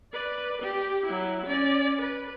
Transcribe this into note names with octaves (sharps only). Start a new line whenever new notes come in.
B4 D5
G4
F#3 E4
C#4 D5
B4